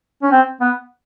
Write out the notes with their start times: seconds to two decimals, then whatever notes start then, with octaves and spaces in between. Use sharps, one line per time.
0.22 C#4
0.31 C4
0.61 B3